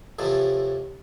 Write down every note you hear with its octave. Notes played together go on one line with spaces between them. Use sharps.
F2 A2 C3 E3